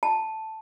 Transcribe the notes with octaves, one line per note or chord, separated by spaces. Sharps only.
A5